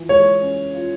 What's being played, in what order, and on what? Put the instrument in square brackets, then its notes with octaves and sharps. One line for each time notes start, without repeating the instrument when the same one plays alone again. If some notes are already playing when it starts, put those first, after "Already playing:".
Already playing: [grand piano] E3 F4
[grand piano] G#3 [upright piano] C#5
[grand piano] C#4
F4